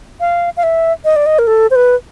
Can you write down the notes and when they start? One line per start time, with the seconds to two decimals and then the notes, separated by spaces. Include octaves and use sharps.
0.20 F5
0.57 F5
0.63 E5
1.05 D#5
1.16 D5
1.26 D#5
1.39 A#4
1.47 A4
1.71 C5
1.76 B4